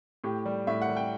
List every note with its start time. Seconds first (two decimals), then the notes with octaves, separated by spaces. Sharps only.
0.24 A2 G4
0.46 G3
0.67 A2 E5
0.82 F#5
0.89 G3
0.97 G5